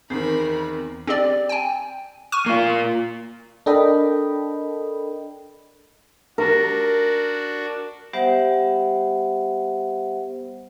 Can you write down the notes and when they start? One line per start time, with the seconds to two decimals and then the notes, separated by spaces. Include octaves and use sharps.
0.10 E2 D#3 C4 A#4 B5
1.07 C4 G4 D5
1.49 G5 G#5
2.32 C#6 F6 D#7
2.46 A#3 F4
3.66 D4 A4 A#4 D#5 G5 B5
6.38 D4 F#4 A#4
8.13 G3 B3 G4 C5 E5 F#5